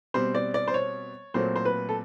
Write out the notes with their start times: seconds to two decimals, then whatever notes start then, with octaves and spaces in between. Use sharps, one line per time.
0.14 B2 G3 C4 C5
0.35 D5
0.54 D5
0.68 C5
0.74 C#5
1.34 A#2 F#3 A3 C4 C5
1.56 C5
1.65 B4
1.89 A4